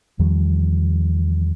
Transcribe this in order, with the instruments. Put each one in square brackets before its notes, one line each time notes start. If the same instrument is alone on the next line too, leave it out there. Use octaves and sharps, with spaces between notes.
[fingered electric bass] E2 D#3 F3 G3